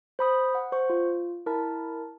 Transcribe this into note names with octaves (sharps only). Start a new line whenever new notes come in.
C5 B5 D#6
F#5
C5 C#6
F4
E4 A#4 A5